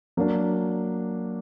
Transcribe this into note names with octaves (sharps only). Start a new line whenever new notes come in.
F#3 A#3 D4